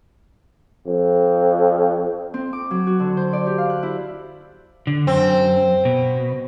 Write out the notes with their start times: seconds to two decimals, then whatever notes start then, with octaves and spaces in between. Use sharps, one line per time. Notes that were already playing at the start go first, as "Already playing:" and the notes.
0.88 F2
2.34 C4
2.53 D6
2.71 F#3
2.87 F#4
3.00 D3
3.17 C5
3.33 D5
3.47 G4
3.58 F5
3.70 F#6
3.83 E4
4.87 D3
5.07 F#2 C4
5.85 B2